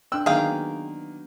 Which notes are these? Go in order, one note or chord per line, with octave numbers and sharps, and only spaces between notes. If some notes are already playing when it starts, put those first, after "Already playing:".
C4 D4 G5 E6 F#6
D#3 F#3 A#3 B3 G#4 F5 G5